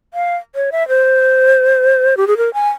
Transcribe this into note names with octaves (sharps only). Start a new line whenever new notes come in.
F5
C#5
E5
C5
G4
G#4
A#4
G#5